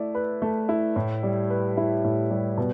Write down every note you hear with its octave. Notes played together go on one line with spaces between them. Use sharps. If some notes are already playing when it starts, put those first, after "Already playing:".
Already playing: A3 E4 D5
B4
A3
E4
A2
G3
B4
E4
A2
G3
B2